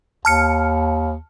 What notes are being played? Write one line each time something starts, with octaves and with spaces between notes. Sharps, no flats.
D#2 A5 F6 C#7